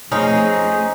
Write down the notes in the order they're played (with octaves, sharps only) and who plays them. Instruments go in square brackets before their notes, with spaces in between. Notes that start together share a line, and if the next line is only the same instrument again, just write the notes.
[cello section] F2 A3 G#4 [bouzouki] C4 C#4 D#4